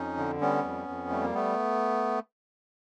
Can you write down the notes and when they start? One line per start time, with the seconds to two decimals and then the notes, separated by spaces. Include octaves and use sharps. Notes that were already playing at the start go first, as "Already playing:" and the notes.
Already playing: F2 C#4 D#4
0.18 D3
0.41 G3 B3 C#4
0.64 F2
0.88 F2
1.10 G3 A3
1.22 A#3
1.35 A3 B3